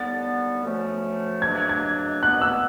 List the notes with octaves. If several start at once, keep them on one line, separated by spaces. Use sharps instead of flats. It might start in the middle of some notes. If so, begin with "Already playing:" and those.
Already playing: D#2 D3 G3 B3 A6
F#2 D3 F3 A3 C#4
E2 B2 F#3 A#3 D4 G#6
G#6
C2 B2 G3 B3 F#6
E6